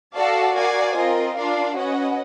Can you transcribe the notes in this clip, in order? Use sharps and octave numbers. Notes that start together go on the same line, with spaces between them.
F#4 A4 D5 F5 A5
F#4 A#4 D5 F5 G#5
C4 F4 A#4 D#5
D4 F4 A#4 D5 F5
C#4 F#4 B4 D#5 F#5